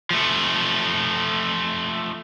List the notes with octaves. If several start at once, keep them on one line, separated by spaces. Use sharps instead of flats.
F3 A3